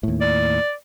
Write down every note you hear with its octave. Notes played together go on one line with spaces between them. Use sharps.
D#2 A2
D5